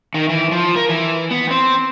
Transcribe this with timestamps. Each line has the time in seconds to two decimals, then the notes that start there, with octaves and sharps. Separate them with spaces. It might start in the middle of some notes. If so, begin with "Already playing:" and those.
0.14 D#3
0.29 E3
0.52 F3
0.76 A#4
0.89 E3
1.31 B3
1.51 C4